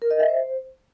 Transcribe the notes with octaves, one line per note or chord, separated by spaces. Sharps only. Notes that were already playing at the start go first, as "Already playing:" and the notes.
A#4
D#5
E5
C5